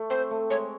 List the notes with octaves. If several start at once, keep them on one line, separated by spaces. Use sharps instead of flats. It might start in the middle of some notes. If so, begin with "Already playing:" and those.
Already playing: A3
C4 C5
A3
G#3 C#5